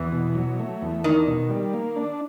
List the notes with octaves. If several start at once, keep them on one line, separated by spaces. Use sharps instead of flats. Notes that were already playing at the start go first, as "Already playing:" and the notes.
Already playing: E2 E3
B2
F#3
A3
E2
D#3 D4
B2
G3
A#3
D4